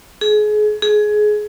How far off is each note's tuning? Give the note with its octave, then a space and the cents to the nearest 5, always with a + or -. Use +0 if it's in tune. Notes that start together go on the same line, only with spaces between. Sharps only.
G#4 +30
G#4 +20